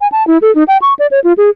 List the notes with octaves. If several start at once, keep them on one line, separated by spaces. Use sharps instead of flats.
G#5
A5
E4
A4
D#4
G5
C#6
D5
C#5
F4
G#4